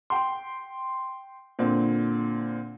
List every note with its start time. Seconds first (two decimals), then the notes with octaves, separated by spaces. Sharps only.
0.10 G5 C6
1.59 A#2 D3 C4